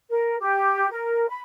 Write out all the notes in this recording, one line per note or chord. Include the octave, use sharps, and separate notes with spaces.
A#4
G4
A#4
B5